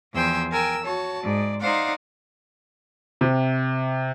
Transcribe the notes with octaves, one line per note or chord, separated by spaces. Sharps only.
E2 F3 C5 G5 G#5 E6
A#4 G5 G#5 E6
F#4 C#5 A5
G#2 D5
D#4 C5 D5 F5 F#5
C3